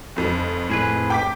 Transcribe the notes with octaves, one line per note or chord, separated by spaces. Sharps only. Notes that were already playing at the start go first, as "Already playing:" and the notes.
F1 F2
A2 G#4 B4
G5 D6 B6